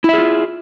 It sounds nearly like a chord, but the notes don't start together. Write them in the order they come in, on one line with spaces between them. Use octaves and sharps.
E4 E5 G#4 F4